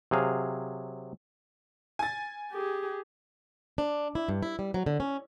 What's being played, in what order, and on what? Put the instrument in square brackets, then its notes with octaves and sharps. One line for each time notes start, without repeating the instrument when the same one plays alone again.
[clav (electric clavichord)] C3 F#3 G#4 F5
[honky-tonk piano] G#5 A6
[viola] G4 G#4
[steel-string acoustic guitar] D4
E4
G2
E4
G3
F#3
D3
C#4